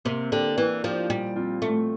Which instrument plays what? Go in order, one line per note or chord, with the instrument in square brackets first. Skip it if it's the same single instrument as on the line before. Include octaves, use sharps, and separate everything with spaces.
[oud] C3 [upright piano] A#3
[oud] D3 [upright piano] D4 G4
[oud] E3 [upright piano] A#3
[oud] F3 [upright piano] D4 G4
[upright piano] A#2 [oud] G3
[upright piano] F3 C4 F4
[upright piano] A#2 [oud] A3